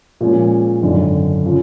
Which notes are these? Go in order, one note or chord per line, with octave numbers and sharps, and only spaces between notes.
A#2 F3 G#3 C#4
G#1 F#2 D3
C#3 F3